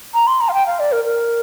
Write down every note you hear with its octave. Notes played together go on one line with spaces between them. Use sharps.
A#5
C6
A#5
F5
G5
F5
D5
A#4
A#4